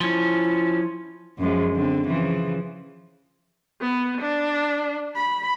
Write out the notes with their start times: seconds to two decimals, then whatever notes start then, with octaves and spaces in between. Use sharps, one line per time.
0.01 F3 C#4 E4
1.39 F#2 F3 G#3
1.74 D3 C4
2.06 C#3 E3 F3
3.81 B3
4.21 D4
5.16 B5